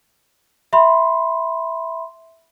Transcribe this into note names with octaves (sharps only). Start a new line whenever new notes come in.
E5 B5 C6